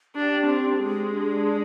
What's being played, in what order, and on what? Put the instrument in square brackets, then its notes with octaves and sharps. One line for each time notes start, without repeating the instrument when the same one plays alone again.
[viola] D4 [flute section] G4
[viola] C4
[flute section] G4
[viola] G#3
[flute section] D4